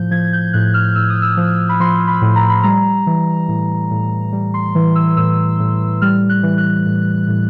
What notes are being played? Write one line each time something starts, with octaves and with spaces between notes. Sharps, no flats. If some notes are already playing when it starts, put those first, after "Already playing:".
Already playing: A2 F3 G6
F3 G#6
G6
A2 F#6
F6
A2 E6
D#6
E6
F3
B5
F3 C6
B5
A2
A#5
B5
G3 A#5
E3
A2
A2
G3
C6
E3
E6
A2 E6
A2
G3 F6
F#6
E3
F#6
A2
A2